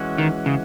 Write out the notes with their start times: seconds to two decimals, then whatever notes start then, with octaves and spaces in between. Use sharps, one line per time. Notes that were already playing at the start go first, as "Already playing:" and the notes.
Already playing: E3 G#3 C#4 F#4
0.18 D#3
0.46 C#3